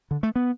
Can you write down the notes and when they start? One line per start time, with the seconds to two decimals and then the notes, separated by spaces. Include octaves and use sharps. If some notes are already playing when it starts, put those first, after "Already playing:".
0.11 D3
0.23 A3
0.36 B3